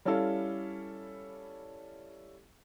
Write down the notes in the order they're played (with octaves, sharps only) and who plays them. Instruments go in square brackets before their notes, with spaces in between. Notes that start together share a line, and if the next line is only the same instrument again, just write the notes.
[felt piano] G3 C#4 E4 A4 F5